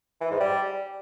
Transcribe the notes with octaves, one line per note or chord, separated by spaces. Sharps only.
E3
G#2
G3